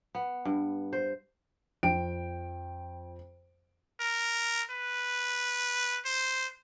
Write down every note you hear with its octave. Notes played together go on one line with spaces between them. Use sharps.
B3
G2
C5
F2 G5 D7
A#4
B4
C5